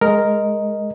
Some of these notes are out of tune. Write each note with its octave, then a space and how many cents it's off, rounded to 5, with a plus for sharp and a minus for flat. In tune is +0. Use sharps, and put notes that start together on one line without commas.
G#3 +0 A#4 +0 D#5 +0